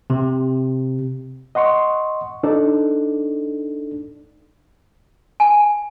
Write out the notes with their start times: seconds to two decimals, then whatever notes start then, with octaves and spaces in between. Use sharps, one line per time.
0.10 C3
1.55 D#5 F#5 C6 C#6
2.43 D4 D#4 A4 D5
5.40 G#5